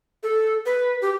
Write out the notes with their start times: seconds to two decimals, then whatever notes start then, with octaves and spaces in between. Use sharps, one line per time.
0.23 A4
0.66 B4
1.02 G4